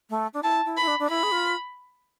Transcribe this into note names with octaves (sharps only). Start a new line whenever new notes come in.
A3
D4
E4 A5
E4
E4 B5
D4
D4
E4 B5
G#4
F4